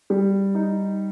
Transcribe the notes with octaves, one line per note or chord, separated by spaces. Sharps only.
G3
D#4